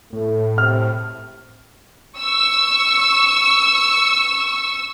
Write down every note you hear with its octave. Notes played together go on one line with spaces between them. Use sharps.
A2 A3
C3 F6
C#6 E6